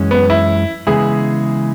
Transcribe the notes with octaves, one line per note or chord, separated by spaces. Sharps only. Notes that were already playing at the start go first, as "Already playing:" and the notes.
Already playing: F#2 E3 G#3 C#4
B3
E4
C#3 E3 G#3 B3 E4 G#4